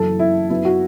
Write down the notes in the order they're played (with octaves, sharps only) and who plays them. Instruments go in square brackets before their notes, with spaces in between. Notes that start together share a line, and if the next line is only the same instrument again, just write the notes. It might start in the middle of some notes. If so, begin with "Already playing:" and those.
Already playing: [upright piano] F#1 F#2 E3 A4
E4
F#2 F#3 B3 E4
F#4